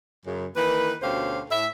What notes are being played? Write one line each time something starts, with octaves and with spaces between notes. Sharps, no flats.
F#2 C#3
D#3 E3 A#3 B4
D2 B2 C#4 G4 C5 F5
A2 E5